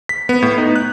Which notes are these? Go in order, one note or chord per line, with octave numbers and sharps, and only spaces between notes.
B6
B3
A2
D#4
F#6